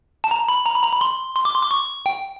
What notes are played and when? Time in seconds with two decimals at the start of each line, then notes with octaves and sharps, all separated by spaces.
0.24 A5
0.31 A#5
0.48 B5
0.66 A#5
0.75 B5
0.84 A#5
0.92 B5
1.01 C6
1.36 C6
1.45 D6
1.54 C6
1.62 D6
1.71 C#6
2.06 G5